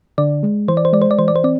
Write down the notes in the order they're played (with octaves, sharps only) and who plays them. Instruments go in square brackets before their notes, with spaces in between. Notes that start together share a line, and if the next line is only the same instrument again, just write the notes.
[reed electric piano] D3 [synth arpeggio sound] D5
[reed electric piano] G#3
[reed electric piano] E3 [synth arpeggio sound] C5
[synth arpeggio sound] D5
C5
[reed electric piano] G#3 [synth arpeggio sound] D5
[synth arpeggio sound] C5
D5
[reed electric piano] E3 [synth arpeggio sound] C5
[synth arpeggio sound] D5
C5
[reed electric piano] C4 [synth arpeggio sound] D5